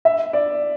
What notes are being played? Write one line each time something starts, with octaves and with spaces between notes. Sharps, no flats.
E5
D5